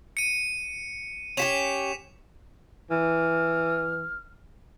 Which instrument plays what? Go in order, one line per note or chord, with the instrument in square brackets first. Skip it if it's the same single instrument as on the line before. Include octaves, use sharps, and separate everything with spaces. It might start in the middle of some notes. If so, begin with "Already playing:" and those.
[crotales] C#7 D#7
[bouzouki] C#4 F#4 G4 [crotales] B6 E7 F7
[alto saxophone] E3 [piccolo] F6